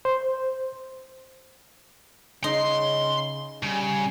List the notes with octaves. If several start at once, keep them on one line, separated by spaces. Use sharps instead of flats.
C5
C#3 D#4 C6
C#3 G3 G#5